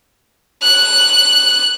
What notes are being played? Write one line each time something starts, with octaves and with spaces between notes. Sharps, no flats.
F#6